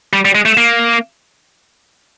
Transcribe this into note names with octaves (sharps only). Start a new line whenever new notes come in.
G3
G3
G#3
A3
A#3